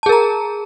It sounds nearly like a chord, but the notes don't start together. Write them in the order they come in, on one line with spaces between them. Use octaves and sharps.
A5 G#4 A#4 A#5